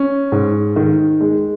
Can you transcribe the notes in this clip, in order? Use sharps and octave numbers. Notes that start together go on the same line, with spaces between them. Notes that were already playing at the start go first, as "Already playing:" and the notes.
Already playing: C#4
G#2
D#3
G#3